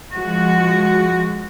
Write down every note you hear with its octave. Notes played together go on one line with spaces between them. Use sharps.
F3 G#3 F#4